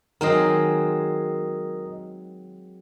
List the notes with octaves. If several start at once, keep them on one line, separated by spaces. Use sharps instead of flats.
D#3 F#3 G#3 C4 A#4 D#5